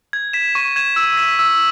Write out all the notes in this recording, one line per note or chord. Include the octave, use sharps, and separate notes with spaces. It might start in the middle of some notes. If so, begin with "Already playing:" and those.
G#6
B6 E7
C#6
G#6 E7
E6
B6 E7
E6